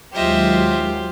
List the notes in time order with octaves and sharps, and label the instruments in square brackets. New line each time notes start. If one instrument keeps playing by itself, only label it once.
[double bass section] D#2 F#3 G#3 [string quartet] F4 G4 C5 [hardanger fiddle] D#5 E5